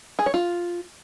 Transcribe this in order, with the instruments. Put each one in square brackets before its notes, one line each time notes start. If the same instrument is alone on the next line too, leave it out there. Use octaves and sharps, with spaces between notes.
[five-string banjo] G#4
C#5
F4